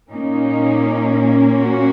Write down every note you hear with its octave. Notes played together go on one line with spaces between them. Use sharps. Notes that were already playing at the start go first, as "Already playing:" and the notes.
A#2 A#3 C#4 D#4
F#4